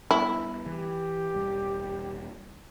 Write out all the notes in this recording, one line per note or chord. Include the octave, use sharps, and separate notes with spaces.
G3 B3 E4
E3 G4
E1 G3